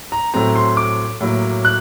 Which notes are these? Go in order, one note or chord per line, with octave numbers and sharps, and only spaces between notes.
A#5
A2 F#3 A3 C4 A#5
C6
D6
A2 F#3 A#3
F#6